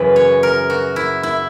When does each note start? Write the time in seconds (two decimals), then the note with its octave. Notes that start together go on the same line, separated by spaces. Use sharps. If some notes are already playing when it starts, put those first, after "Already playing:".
Already playing: F#2 C#3 E3 B3 B4
0.16 C#5
0.43 A#4
0.70 F#4
0.96 E4
1.23 E4